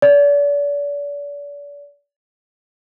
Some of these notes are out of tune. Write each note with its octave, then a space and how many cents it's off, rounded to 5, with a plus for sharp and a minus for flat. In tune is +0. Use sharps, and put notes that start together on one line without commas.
D5 -40